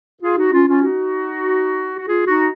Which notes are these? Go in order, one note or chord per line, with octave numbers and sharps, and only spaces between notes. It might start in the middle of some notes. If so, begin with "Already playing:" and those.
F4 G#4
D#4 F#4
C#4 F4
C#4 F4
D#4 F#4
F#4
F4 G#4
D#4 F#4